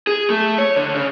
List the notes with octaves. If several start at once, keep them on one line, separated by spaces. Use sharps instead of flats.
G#4
A3
C#5
D3
C#3